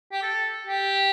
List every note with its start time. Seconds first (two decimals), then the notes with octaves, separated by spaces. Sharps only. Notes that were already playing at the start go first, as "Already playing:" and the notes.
0.12 G4
0.23 A4
0.66 G4